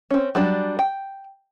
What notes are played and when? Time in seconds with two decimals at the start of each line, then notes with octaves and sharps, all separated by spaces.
0.11 C4 C#4
0.35 F#3 G3 D4
0.79 G5